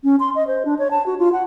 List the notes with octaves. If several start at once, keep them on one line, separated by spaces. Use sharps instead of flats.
C#4
C6
D#5
C5
D4
C#5
A5
F#4
F4
F#5